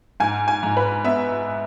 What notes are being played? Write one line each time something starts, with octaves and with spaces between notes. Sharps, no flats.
G#2 G#5
G#5
G#2
B4
B3 E5